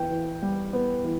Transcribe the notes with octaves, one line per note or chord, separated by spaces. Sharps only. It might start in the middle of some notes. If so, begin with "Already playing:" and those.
Already playing: E3 B3 G5
E3
G3
B3
E3